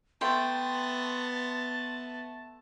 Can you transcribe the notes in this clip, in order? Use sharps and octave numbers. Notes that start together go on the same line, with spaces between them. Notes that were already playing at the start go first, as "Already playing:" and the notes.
A3 B3 G5 A5 C6